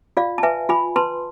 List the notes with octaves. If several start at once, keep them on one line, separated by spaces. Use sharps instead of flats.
F4 D5 F5
A5
B4 E5 G#5
F4 G#5 B5
B4 A5 C6